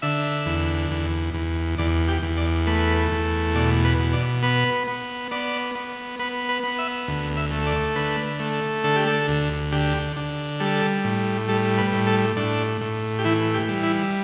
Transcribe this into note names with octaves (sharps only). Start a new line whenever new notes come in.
D3 E5
E2
E2
E2
E2 D5
G4
E2
D5
A3 B4
E2
B2 D5
B4
B2
D5
B3 B4
B3
B3 D5
B3
B3 B4
B4
B3
E5
D2
E5
A3
D5
D3 B4
A3
D3 A4
G4
A4
D2
D3 G4
D3
G3 A4
A2
G3 A4
B4
A2
A4
A2 D4
A2
G4
E3 E4
G4
G3
E4